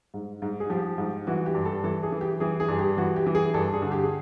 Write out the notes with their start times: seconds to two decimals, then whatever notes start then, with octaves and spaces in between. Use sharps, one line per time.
0.14 G#2
0.42 G#2
0.60 G#4
0.70 F3 G4
0.98 G#2
1.27 E3 F#4
1.46 G4
1.55 G2
1.65 A4
1.84 E3 A4
2.03 G#4
2.12 E3
2.21 G4
2.40 E3 G#4
2.60 G#4
2.68 G2
2.79 G4
2.97 E3 F#4
3.16 G4
3.26 E3
3.35 G#4
3.54 G2 A4
3.73 G#4
3.82 D3
3.92 G4
4.04 G#4